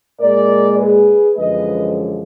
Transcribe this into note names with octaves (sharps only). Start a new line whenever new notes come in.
A#2 G#3 A#4 D5
G#4 B4
F#2 D3 F3 G#3 B4 D#5